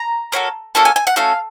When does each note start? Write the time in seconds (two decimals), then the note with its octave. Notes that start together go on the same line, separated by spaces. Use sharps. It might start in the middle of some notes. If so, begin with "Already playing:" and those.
Already playing: A#5
0.32 A#3 C#4 F#4 A4
0.75 A#3 C#4 F#4 A4 A5
0.85 G#5
0.96 G#5
1.07 F#5
1.16 A3 C#4 F#4 A4 F5